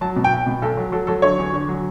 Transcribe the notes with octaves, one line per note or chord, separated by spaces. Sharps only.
F#3 A5
B2
G5
B1
B2
B1 A4
F#3
F#3 A4
F#3 A4
D3 C#5
E2
D3
F#3